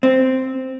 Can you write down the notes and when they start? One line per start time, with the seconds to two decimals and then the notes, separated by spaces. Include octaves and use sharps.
0.03 C4